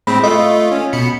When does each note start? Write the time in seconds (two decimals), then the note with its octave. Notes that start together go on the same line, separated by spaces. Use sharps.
0.07 A2 G#3 C4 B5
0.24 A3 F4 D#5
0.72 C#4
0.93 B2 B5 C#7